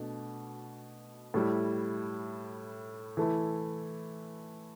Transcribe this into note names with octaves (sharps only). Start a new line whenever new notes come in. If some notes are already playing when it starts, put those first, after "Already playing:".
Already playing: B2 A3 D4
A2 G3 E4
E3 A3 E4